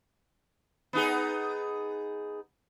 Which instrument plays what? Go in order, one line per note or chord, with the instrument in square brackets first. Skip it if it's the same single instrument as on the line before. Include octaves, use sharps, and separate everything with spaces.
[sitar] B3 D#4 G#4